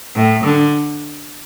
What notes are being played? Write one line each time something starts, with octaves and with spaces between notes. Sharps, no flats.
A2
D3